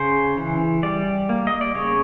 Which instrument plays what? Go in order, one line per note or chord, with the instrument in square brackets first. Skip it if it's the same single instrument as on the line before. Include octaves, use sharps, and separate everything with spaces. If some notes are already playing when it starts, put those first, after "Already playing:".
Already playing: [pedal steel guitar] C#3 C5
E3
G3 D5
A#3
D#5
D5
C#3 C#5